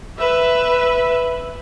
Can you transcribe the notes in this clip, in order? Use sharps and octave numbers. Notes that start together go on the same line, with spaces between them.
B4 E5